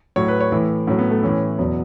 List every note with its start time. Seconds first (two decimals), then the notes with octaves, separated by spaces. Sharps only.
0.16 A2 F#3 C#5
0.28 B4
0.40 C#5
0.52 A2 E3
0.87 A2 F#3 C#4
0.99 B3
1.11 A3
1.23 A2 E3 C#4
1.59 E2 B2 F#3